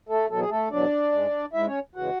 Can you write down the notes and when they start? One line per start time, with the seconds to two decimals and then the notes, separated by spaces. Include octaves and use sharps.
0.09 A3 A4
0.29 E2 B2 F#3 A4
0.40 G#4
0.49 A3 A4
0.71 E2 B2 F#3 D4 D5
1.12 G#2 G#3
1.53 G#2 G#3 E4 E5
1.67 C#4 C#5
1.95 E2 C#3 E3 G#3 F#4 F#5